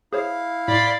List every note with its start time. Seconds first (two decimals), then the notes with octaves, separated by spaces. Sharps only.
0.13 E4 G#4 C5 C#5 F5
0.68 A2 D5 B5 C6